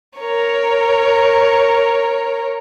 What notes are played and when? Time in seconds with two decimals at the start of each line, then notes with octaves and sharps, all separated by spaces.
0.18 A#4 C#5